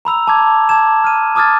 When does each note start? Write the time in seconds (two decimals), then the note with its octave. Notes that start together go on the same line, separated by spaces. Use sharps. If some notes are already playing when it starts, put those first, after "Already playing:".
0.05 A#5 B5 E6 F7
0.27 A5 D6 G#6
0.69 A5 D6 G#6 E7
1.04 F6 D#7
1.35 A5 D6 D#6 F6 G#6 A6